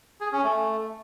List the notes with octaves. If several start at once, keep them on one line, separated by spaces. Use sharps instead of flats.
G#4
C#4
A3